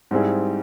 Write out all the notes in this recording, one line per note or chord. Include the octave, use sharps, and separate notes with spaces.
G#2 G3 C4 E4 G#4